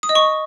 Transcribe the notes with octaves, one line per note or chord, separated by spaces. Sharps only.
D#6
D#5
C#6